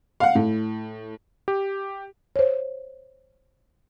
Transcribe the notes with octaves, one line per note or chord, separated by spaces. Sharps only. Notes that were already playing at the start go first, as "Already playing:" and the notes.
F5 F#5
A2
G4
C5 C#5